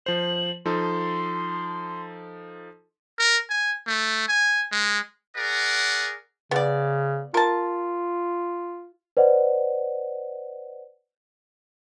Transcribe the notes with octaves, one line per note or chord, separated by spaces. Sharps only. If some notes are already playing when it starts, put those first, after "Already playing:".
F3 C5 F#7
F3 D#4 A4 C6
A#4
G#5
A3
G#5
G#3
G#4 A#4 D5 F#5
C#3 B3 D5
F4 A#4 A5
B4 C5 D5 D#5 F#5